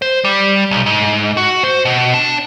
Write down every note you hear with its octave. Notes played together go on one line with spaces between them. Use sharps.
C5
G3
B1
G#2
F#4
C5
B2
D4